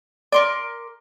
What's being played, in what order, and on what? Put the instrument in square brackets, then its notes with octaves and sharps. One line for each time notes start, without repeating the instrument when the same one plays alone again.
[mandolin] A#4 C6 D6 [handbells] D5